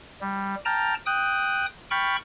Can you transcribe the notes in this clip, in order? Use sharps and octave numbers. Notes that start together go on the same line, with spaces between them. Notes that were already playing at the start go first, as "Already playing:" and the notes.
G3
G5 A5 A#5 F6
G5 D#6 F#6
G5 B5 C#6 F6 A6